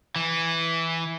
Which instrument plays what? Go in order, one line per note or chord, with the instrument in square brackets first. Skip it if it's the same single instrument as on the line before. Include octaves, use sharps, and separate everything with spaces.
[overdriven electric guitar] E3